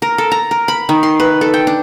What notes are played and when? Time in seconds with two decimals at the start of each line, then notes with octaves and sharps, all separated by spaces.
0.02 A#4
0.18 A4
0.32 A#5
0.51 A#4
0.68 B5
0.89 D#3
1.03 C6
1.20 B4
1.41 A4
1.54 G5
1.67 D4